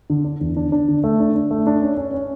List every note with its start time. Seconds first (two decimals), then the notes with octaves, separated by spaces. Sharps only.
0.10 D3
0.24 D4
0.41 E2
0.56 D4
0.72 D4
0.88 D3
1.04 A3
1.20 D4
1.35 D4
1.51 A3
1.67 D4
1.82 C#4
1.97 C#4
2.14 C#4